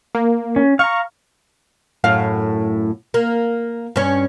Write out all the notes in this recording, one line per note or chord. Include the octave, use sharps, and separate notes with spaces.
A#3
C#4
F5 A#5 C#6
F#2 A2 F5
A#3
G2 C#4